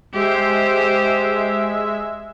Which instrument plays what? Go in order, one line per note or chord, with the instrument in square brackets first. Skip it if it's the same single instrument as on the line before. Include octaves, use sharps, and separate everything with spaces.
[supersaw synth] G#3 E5 [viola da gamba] G4 C5